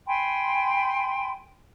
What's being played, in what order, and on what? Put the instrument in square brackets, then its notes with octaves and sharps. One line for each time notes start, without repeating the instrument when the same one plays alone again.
[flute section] G5 G#5 B5 C6